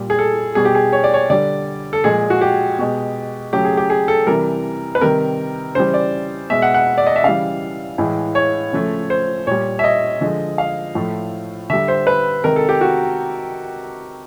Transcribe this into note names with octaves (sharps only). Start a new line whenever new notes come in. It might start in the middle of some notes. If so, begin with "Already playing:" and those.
Already playing: A#2 G3
G#4
A4
B2 G3 G#4
G4
G#4
C#5
D5
C#5
D3 G3 D5
A4
A#2 F3 G#3 G#4
F#4
G4
B2 G#3
C#3 F#3 A3 G4
G#4
G4
G#4
A4
C3 E3 G3 A#4
B4
C3 D#3 G3 A#4
C#3 E3 G3 C5
D5
B2 G#3 E5
F#5
F#5
D5
D#5
E5
C#3 E3 G3 F5
A2 E3 G#3
C#5
C#3 F3 A3
C5
A#2 G3 C#5
E5
D#5
D3 F3 G#3
F5
A2 F3 A3
D3 G3 E5
C5
B4
C3 D#3 G#3 A#4
A4
G4
F#4